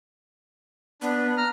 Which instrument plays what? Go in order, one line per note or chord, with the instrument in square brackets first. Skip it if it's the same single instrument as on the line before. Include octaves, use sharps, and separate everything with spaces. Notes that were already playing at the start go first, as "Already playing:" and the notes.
[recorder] B3 [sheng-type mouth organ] D4
[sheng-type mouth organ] A#5 F6